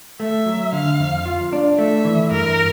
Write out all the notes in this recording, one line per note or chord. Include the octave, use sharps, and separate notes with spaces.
A3 E5
F#3
D3 F5
F2
F4
D4
A3 E5
E3
G2 A#4